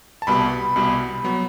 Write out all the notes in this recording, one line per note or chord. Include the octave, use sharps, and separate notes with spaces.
A5
C2 B2 G3 B3 B5
C2 B2 G3 B3
F#3 B3